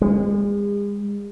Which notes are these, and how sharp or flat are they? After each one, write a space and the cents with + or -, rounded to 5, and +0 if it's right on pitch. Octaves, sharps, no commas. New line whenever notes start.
G#3 -40